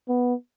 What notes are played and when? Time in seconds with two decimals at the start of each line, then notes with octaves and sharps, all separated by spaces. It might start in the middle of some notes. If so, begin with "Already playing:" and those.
0.08 B3